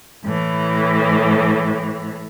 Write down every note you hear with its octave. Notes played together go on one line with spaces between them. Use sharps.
A2 E3